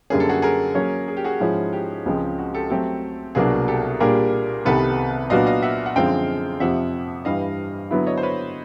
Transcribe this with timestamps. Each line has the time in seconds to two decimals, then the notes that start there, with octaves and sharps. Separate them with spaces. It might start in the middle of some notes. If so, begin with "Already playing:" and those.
0.10 F#2 D3 G3 A#3 C#4 G#4
0.20 A4
0.29 F#4 G#4
0.42 G#4 A#4
0.75 F#3 A#3 C#4
1.08 G#4
1.17 G4
1.24 F#4 G#4
1.40 G#2 F3 G#3 C#4 E4
1.73 G4
2.06 C#2 C#3 F3 G#3 C4
2.38 F#4
2.54 G4 A4
2.70 F#3 A3 C4 G4 A4
3.35 C2 B2 F#3 A#3 D4 F#4 G#4
3.68 G4 A4
4.00 A#2 G3 A#3 D4 G4 G#4 A#4
4.65 C2 C3 D#3 G3 B3 A4 B4
5.30 A#2 F#3 B3 D4 F#4 D#5 F5
5.46 D#5 F5
5.62 E5 F#5
5.86 F#5
5.96 F#2 D3 F3 G#3 C4 F5 G5
6.60 F2 C3 F3 E5 F#5
7.25 G2 E3 G3 D#5 F5
7.91 D3 F#3 B3 E4
8.07 C#5 D#5
8.18 C5
8.23 B4 C#5